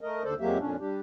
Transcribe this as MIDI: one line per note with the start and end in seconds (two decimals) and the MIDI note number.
0.01 0.23 57
0.01 0.23 70
0.01 0.23 75
0.24 0.34 39
0.24 0.34 50
0.24 0.34 69
0.24 0.34 72
0.24 0.34 74
0.40 0.58 41
0.40 0.58 54
0.40 0.58 56
0.40 0.58 58
0.40 0.58 67
0.40 0.58 76
0.59 0.76 41
0.59 0.76 46
0.59 0.76 61
0.59 0.76 62
0.80 1.00 55
0.80 1.00 62
0.80 1.00 67